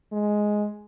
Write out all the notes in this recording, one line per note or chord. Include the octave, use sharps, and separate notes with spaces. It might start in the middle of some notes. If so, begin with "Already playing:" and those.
G#3